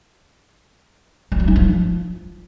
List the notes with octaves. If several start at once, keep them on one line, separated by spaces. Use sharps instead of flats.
F3
F#3
D#4
F3